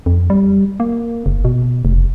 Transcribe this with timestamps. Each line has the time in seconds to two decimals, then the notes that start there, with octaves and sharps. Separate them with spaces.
0.06 F2
0.30 G3
0.80 A#3
1.26 F#1
1.45 B2
1.85 F1